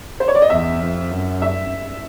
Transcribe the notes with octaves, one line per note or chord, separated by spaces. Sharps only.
C5
C#5
D5
D#5
E2 E5
F2
F#2
E5